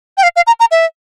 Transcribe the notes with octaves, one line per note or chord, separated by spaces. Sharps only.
G5
F5
F5
A#5
A#5
E5